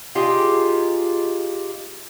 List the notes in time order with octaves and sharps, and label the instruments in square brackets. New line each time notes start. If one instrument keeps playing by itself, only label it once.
[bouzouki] D#4 F4 G4 G#4